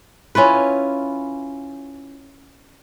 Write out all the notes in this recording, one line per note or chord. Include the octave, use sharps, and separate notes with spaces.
C#4 E4 F4 B4